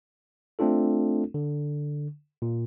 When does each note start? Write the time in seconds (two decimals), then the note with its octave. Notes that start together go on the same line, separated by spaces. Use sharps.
0.59 A3 C4 D4 F4 A4
1.34 D3
2.42 A#2